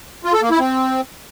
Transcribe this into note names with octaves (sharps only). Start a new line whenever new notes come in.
F4
A4
A#3
E4
C4